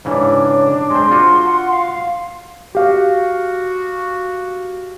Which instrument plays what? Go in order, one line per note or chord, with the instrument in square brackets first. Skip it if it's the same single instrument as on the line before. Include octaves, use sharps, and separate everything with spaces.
[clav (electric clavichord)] G#2 C#3 E3 [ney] D4 [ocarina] C#5
[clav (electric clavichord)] G#3 C4 [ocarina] C6
[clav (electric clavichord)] F4 F#4
[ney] F#5
F5
[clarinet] F#4 [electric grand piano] G4 F5